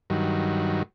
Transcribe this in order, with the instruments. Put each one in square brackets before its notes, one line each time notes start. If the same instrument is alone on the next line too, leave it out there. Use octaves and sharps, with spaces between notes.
[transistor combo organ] G2 D#3 F#3